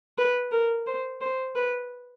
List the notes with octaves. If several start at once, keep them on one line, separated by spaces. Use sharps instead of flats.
B4
A#4
C5
C5
B4